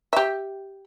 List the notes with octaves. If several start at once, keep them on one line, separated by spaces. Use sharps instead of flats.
G4 E5